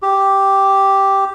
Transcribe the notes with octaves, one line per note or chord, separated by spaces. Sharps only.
G4